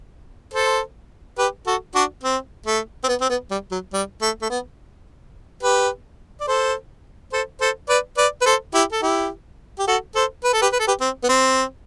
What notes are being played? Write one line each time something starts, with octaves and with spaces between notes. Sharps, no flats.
A4 C5
G4 B4
F#4 A4
D4 F#4
C4
A3
C4
B3
C4
B3
G3
F#3
G3
A3
A3
B3
G4 B4
D5
A4 C5
A4 C5
A4 C5
B4 D5
B4 D5
B4
A4 C5
E4 G4
A4
E4 G4
G4
F#4 A4
A4 C5
B4
A4
G4 B4
B4
A4
G4 B4
C4
B3
C4